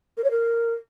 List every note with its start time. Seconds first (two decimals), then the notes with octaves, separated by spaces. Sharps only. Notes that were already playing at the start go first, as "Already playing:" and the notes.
0.17 A#4
0.24 C#5
0.31 A#4